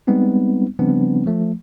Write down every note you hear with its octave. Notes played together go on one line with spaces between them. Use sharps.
G3 G#3 B3 C4 D#4
C#3 F3 G3 B3 C4 D4
F3 A3